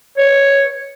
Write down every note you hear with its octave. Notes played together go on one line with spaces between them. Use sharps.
C#5